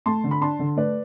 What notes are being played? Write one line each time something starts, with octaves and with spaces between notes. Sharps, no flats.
A3 A5 C6
D3
B5
D4 A5 C6
D3
A3 B4 D5